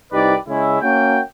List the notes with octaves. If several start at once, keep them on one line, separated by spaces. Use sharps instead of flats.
C2 D#4 G4 B4 D5
C#3 G#3 C#4 E4
A#3 C#4 F#4 G5